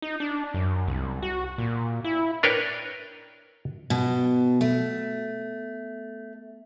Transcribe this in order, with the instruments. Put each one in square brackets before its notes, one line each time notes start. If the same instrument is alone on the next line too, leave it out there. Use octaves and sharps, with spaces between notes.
[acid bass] D#4
D4
F#2
C2
F#4
A#2
E4
[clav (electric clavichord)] D4 A#4 B4 C#5 G5
[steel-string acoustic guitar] B2
A3